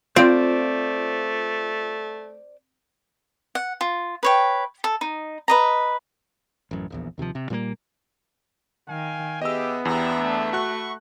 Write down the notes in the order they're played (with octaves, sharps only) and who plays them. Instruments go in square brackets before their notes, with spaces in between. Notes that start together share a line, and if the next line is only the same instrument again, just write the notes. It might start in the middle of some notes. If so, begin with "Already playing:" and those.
[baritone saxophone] A3 [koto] C4 [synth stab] F4 [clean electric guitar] C5 D5
[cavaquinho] F#5
F4
B4 C#5 G5
A4
D#4
B4 D#5 A#5
[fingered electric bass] A1 F#2
D#1 A#1 E2
D#2 C3 E3 F3
C3
A#2 G3 A3 A#3
[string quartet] D#3 [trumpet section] F5 G5 G#5
[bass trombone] B3 [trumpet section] G4 [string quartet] G#4 E5 [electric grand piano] D#5 E6
[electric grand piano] E2 [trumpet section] D4 E5 [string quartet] G4 A#5
[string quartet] A3
[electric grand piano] F#4 F#6 [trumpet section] E5 B5 C#6